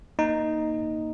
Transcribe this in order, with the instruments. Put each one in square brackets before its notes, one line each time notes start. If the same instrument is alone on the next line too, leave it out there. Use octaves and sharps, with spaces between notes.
[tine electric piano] A#3 D#4